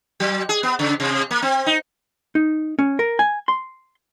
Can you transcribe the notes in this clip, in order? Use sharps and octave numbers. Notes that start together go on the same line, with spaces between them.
F#3
G#4
B3
C#3
C3
A#3
C4
D#4
D#4
C#4
A#4
G#5
C6